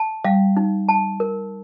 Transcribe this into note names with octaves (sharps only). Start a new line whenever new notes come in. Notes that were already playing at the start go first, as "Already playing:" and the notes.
Already playing: A5
G3 F5
D#4
A5
A#4